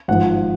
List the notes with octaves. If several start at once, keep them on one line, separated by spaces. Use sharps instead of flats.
G#1 G#2 F3 F#5